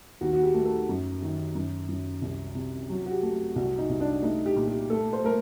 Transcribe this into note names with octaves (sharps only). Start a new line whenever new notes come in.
D#2 F#4
F#4
G4
A3
A4
F#2
D#3
F#2
F#2
C2
C3
F#3
F#4
G4
A3
C2 F#4
D#4
C2
D4
A3 D#4
G4
A#2
G4
A3 A4
C5
A3 A#4